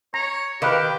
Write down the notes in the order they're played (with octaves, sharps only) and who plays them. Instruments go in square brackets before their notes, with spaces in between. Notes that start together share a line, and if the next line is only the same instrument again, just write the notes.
[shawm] C#5 [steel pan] A#5 [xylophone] A#6
[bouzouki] D#3 [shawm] G4 [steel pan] A#4 B4 [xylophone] F5 B5 F#6